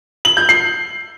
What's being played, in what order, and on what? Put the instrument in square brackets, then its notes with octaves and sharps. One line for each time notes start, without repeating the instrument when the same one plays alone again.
[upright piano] F#7
G6
C7